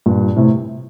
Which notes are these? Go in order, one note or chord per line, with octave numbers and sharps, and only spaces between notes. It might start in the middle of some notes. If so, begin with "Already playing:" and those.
G2 A#2
A2 C3